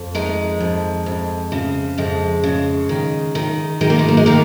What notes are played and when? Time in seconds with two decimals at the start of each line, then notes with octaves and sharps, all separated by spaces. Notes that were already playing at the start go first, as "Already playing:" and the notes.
Already playing: F2
0.15 D#3 G#3
0.60 F2
1.06 F2
1.52 C#3
1.98 F2 G#3
2.43 C#3
2.89 D#3
3.35 D#3
3.81 D#3 G#3
3.90 A#3
3.99 G#3
4.08 A#3
4.17 G#3
4.26 D#3 A#3